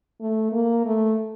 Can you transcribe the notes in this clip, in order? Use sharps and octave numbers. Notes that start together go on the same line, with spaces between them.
A3
A#3
A3